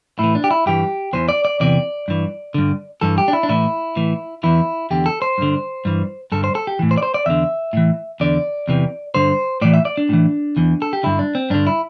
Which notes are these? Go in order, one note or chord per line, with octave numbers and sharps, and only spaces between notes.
A2 E3 E4
D4
G4
E4
G2 E3 G4
E2 E3 C5
D5
D5
E2 C3 E3 D5
G2 E3
G2 D3
G2 E3 A4
G4
D4
E4
D4
A2 E3 E4
A2 E3
E2 E3 E4
E2 D3 G4
A4
C5
G2 D3
G2 E3
G2 D3 A4
C5
A4
G4
A2 E3
C5
D5
C5
D5
E2 D3 E5
A2 E3
E2 D3 D5
E2 C3 E3
G2 D3 C5
A2 E3 D5
E5
D5
D4
A2 E3
E2 E3
A4
G4
G2 D3 E4
D4
C4
G2 D3 D4
E4